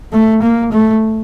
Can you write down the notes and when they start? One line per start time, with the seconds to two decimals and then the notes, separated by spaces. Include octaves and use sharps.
0.13 A3
0.42 A#3
0.72 A3